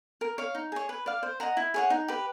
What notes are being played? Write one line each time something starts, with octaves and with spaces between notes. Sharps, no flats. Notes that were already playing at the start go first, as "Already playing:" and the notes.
A#4
C#5 F5
D#4
G#4 C#5
B4
D5 F5
C5
D#5 F#5 A#5
E4
G#4 C#5 F#5
D#4
G4 B4